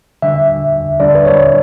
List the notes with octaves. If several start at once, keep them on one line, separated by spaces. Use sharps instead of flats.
D3 G3 D4 E5
D3 G3 D4 D5
B4
C#5